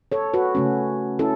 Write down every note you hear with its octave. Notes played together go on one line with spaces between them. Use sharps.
A4 C#5
F#4 B4
C#3 A3 C#4
C#4 E4 A4